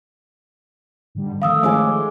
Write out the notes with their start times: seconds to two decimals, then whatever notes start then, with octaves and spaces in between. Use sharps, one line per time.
1.15 G#2 D3 G3
1.42 D#3 F3 A3 F5 D#6 E6
1.63 G#3 C6 D6